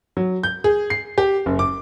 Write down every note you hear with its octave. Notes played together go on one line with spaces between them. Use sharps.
F#3
G6
G#4
C7
G4
F#1
D6